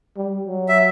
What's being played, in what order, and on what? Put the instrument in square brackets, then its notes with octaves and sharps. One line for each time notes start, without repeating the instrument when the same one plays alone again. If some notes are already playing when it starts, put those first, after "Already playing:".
[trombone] G3
F#3
[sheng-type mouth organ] E5